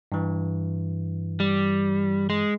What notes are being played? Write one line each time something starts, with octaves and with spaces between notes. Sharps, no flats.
G2 E3
G3
G#3